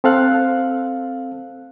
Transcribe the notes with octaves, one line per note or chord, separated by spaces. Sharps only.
C4 A4 F5 F#6